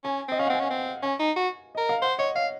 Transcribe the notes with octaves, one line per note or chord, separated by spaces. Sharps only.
C#4 G#5
C4 D#5
C#4 F5
F#5
C4 G#5
C#4
C4
C#4 G#5
D#4
F#4
A#4 D#5
F5
C5 F#5
C#5 D#5
C#5 F5